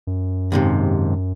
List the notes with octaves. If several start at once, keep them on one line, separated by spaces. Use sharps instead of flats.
F#2
D#2 G#2 C3